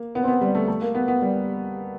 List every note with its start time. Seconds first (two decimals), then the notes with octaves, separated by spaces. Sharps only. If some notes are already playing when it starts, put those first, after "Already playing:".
Already playing: A#3
0.15 B3
0.24 C4
0.28 B3
0.41 G3
0.55 A3
0.68 A3
0.82 A#3
0.95 B3
1.08 B3
1.22 G3